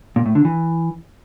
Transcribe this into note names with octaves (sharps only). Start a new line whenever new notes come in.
A#2
A2
D3
E3